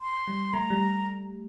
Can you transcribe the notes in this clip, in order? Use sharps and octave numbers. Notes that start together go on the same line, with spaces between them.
C6
G3
A3 A#5
G3